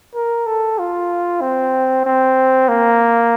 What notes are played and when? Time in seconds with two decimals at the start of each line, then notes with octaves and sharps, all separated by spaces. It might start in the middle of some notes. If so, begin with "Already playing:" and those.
0.15 A#4
0.46 A4
0.79 F4
1.41 C4
2.05 C4
2.69 A#3